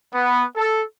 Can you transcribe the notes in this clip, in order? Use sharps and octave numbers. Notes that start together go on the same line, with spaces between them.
B3
A4